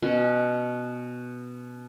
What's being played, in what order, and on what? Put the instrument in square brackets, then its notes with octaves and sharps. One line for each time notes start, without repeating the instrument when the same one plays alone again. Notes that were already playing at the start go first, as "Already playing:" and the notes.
[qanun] B2 C#4